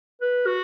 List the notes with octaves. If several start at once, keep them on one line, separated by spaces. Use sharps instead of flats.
B4
F#4